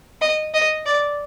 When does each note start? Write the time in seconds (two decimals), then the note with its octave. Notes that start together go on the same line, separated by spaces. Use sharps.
0.21 D#5
0.54 D#5
0.86 D5